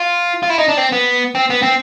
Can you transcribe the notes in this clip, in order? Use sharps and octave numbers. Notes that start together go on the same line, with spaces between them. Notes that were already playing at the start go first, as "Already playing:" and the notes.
Already playing: F4
F4
E4
D#4
D4
C4
B3
C4
B3
C4